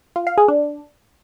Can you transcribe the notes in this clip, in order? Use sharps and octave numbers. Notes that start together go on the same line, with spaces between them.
F4
F5
G#4
D4